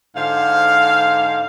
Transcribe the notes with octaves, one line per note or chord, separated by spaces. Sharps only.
G#2 D3 C5 F5